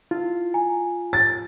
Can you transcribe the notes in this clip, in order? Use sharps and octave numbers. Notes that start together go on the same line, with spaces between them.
E4 F4
G#5 A#5
A6